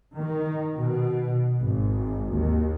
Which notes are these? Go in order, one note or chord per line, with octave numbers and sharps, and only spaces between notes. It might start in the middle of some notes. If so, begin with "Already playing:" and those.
D#3
B2
G#1
D#2